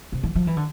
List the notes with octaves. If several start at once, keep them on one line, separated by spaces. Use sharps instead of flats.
C3
E3
F3
E3
D3